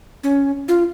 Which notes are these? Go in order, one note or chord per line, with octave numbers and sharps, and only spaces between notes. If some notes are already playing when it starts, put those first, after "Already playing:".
C#4
F4